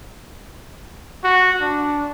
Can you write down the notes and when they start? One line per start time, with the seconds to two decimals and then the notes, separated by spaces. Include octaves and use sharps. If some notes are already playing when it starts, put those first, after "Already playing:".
1.24 F#4
1.61 D4